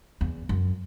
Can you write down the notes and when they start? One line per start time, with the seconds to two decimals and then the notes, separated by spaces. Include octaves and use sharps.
0.21 E2
0.49 F#2